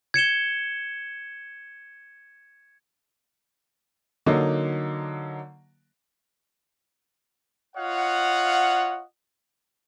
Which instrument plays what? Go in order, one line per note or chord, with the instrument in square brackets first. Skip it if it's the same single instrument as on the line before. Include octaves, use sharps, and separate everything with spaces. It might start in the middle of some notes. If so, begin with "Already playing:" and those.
[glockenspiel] G#6 C#7 E7 G7
[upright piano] D3 F#3 A#3 D#4
[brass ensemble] F4 C#5 D#5 F5 F#5